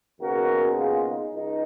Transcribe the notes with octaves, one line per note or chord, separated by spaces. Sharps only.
D#2 C#3 G#3 B3 F#4 A#4
F4 G#4
D#4
C#2 D#4